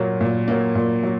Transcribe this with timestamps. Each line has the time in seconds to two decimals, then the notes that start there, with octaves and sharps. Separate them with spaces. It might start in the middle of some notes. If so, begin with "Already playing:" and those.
Already playing: A#2 F#3 A#3
0.21 A#2
0.48 F#3 A#3
0.75 A#2
1.03 F#3